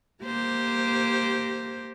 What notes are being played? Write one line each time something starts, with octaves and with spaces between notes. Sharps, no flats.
A#3 G4 C5